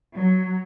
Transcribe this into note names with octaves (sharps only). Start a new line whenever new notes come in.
F#3